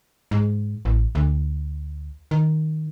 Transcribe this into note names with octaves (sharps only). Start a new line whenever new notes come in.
G#2
A1
D2
D#3